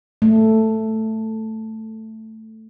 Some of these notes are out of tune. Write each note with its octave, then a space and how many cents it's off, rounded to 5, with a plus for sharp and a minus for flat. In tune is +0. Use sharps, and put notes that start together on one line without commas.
A3 +5